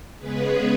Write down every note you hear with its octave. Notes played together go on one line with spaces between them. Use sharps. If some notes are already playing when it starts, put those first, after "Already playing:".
C#3 G#3 B3 G#4 B4